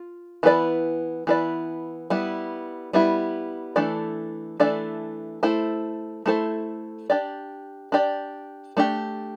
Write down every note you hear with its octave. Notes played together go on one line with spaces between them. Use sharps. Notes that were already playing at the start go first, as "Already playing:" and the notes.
Already playing: F4
E3 B3 E4 B4 D5
E3 B3 E4 B4 D5
G3 B3 E4
G3 B3 E4
E3 A3 D4 A4 D5
E3 A3 D4 A4 D5
A3 E4 A4 C5
A3 E4 A4 C5
D4 G4 D5
D4 G4 D5
A3 D4 G4